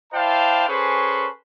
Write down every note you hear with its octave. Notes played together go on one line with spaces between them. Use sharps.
E4 C5 D5 F5 G5 A5
C#4 G#4 A4 B4 C5 C#6